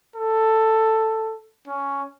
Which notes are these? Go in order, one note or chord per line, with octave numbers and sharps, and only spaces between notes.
A4
C#4